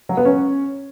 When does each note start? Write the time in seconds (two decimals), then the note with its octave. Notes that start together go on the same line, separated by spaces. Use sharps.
0.09 F#3
0.17 B3
0.25 C#4